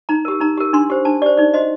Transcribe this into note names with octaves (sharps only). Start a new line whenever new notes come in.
D#4 A#5
G4 A#4
D#4 A#5
G4 A#4
D4 C6
G4 C5
D4 A5
G4 C5 D5
D#4 D5
F#4 C5 D#5